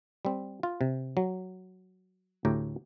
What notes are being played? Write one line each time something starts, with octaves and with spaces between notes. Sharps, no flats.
G3 C4
F4
C3
F#3
D2 A2 G4 G5 A#5